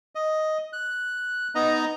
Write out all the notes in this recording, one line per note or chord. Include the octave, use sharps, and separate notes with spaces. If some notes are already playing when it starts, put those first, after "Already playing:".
D#5
F#6
B3 D#4 D#5 A#5